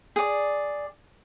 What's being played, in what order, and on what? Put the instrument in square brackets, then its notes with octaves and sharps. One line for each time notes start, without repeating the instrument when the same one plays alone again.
[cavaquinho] G#4 D5